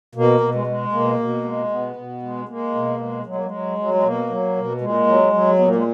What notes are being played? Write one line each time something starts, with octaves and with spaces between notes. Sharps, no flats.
B2 A#3
B2
G#3
G#3
B2 A#3
B2
G#3
B2 B3
B2
G#3
G#3 A#3
B2
G#3
F#3 G#3
A#3
G#3
F#3
F#3
G#3
B2 A#3
F#3
B2
A#2 G#3
F#3
F#3
A#2 B3
A#3
G#3